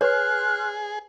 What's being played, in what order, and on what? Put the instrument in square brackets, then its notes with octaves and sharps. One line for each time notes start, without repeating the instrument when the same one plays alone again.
[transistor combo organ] G#4 [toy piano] B4 C#5 [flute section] C6 F6 F#6